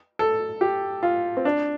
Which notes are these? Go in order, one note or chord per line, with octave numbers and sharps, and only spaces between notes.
A4
G4
F4
C4
D4